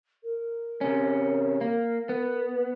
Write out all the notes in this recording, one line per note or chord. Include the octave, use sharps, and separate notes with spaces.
A#4
C3 C#4
A#3
B3